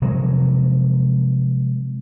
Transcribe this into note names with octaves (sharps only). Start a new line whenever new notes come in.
C3 F3 F#3 G#3